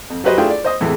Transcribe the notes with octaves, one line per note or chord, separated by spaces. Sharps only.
F2
F#3 F#4 G4 B4 C5 D#5
A3 D4 E4 F4 G#4 G5
D5
C5 D#5 D#6
E2 A2 C3 E3 G#3